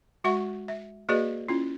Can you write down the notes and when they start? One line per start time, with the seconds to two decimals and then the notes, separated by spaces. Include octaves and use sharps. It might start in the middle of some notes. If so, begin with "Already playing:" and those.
0.24 G#3 F#4 E5 F#5 C#6
0.68 E5
1.09 A#3 F#4 G#4 B4 D5 D#5
1.48 C#4 E4 F4